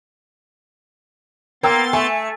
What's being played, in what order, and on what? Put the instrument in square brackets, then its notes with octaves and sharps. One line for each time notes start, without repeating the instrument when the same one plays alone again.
[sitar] A#3 [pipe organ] B3 C6 A6 [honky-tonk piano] A#4 G5 E6
[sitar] A3 [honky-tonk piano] G#5